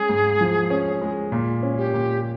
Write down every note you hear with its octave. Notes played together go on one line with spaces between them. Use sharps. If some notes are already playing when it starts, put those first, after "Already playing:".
Already playing: G#3 C#4 G#4
G#2
F3
C#4
G#3
A#2
C#4
G4
A#2